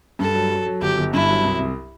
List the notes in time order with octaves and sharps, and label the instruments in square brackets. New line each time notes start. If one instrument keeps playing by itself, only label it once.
[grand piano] G2 [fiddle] A4
[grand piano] F#3
F#3
F#3
[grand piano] G1 [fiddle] G4
[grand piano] G1
[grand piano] G2 [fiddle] E4
[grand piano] F#3
C2
C2